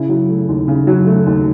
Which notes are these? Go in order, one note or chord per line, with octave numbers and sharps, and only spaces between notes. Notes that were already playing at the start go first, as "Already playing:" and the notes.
Already playing: C#3 E4
F#3
A3
D#2
C#3
F#3
A3
D#2